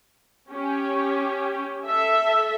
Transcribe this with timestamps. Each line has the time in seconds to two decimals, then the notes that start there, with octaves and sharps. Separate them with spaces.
0.50 C#4 G4
1.85 A4 E5